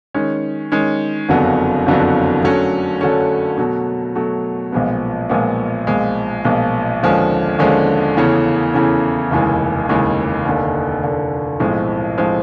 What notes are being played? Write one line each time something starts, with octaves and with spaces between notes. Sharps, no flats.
D#3 G#3 C#4
D#3 G#3 C#4
F#1 F2 D3 F#3 B3
F#1 F2 D3 F#3 B3
D3 F#3 A3 C#4
D3 F#3 A3 C#4
B2 F#3 A3
B2 F#3 A3
B1 A#2 F3 G#3 B3
B1 A#2 F3 G#3 B3
B1 A#2 F3 G#3
B1 A#2 F3 G#3
D#2 D3 F3 G#3 C#4
D#2 D3 F3 G#3 C#4
E2 C#3 E3 A3 C#4
E2 C#3 E3 A3 C#4
F1 D#2 C#3 E3 G#3
F1 D#2 C#3 E3 G#3
F1 D#2 D3
F1 D#2 D3
B1 A2 F3 G#3 C4
A2 F3 G#3 C4